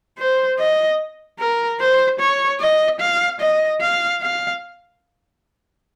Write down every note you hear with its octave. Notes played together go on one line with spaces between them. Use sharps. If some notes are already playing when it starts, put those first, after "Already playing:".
C5
D#5
A#4
C5
C#5
D#5
F5
D#5
F5
F5